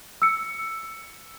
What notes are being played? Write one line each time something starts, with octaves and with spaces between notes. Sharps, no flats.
E6 C#7